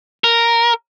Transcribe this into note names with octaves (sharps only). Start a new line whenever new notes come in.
A#4